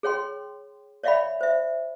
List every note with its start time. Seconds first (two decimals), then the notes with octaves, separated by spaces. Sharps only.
0.03 G#4 C#5 G5 C6
1.03 C#5 D5 E5 F5 G5 B5
1.41 C5 E5